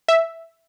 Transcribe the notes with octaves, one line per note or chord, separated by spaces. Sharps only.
E5